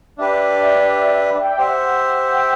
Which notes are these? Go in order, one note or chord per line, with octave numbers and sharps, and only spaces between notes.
D4 G4 B4 E5
D5
E5
G5
G4 C5 E5 F#5
G5